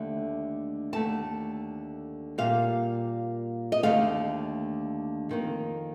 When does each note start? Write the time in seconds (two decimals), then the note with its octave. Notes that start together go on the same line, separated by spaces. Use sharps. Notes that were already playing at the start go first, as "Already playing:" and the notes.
Already playing: D#2 D3 A3
0.93 D#2 D3 A3 A5
2.38 A#2 G3 A#3 F5
3.72 D#5
3.83 D#2 D3 A3 F5
5.29 F2 D#3 A#3